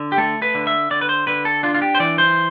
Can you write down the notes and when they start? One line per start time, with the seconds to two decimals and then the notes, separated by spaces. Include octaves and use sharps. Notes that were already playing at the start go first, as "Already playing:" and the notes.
Already playing: D3
0.12 G4
0.18 A3 A4
0.42 B4
0.55 D3
0.67 E5
0.91 D3 D5
1.01 B4
1.09 C5
1.27 D3 B4
1.45 A4
1.63 D4 F4
1.74 F4
1.82 G4
1.95 C5
2.00 E3 D5
2.18 C5